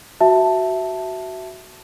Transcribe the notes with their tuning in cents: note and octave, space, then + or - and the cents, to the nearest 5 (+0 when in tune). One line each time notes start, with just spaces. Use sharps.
F#4 +15 E5 +0 A5 +0